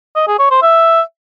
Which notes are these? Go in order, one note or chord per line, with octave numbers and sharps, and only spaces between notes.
D#5
G#4
C#5
C5
E5